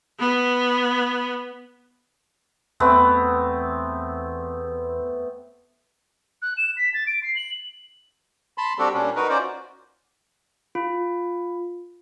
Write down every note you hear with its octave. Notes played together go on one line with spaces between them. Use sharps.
B3
E2 A3 B3 C4
F#6
E7
B6
A6
D7
C7
F#7
A5 B5 C6
G3 C4 D4 F#4 G4 A4
A#2 G3 C#4 D4
D#4 F#4 A#4 B4
C#4 F4 F#4 C5 D5
F4